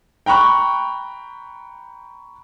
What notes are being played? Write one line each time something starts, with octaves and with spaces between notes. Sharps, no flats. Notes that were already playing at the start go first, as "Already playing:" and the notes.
G5 A#5 B5 C#6 F#6